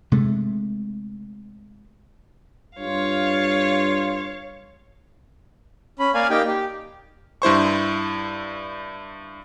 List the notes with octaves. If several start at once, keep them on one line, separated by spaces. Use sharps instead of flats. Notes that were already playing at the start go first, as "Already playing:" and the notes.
C3 G#3 A3
G2 F4 C#5 F5
C#4 B5
A#3 A#4 D5 F5 G#5
A#3 D#4 G4 G5
G4
G2 E4 C5 C#6